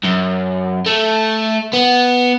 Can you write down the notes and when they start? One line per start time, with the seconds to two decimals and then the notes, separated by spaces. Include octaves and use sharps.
0.04 F#2
0.86 A3
1.73 B3